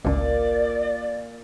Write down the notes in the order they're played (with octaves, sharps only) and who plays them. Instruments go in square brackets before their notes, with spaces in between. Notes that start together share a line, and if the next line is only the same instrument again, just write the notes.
[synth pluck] G#1 C#2 [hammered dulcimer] A#2 [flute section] D5